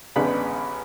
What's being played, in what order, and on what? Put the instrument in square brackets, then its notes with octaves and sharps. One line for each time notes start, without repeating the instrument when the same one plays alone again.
[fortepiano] A1 D3 G#3 B3 D5 B5